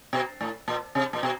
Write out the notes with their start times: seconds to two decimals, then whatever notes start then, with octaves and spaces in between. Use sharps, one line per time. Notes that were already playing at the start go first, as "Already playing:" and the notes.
0.13 B2
0.41 A2
0.68 A#2
0.95 C3
1.13 A#2
1.23 B2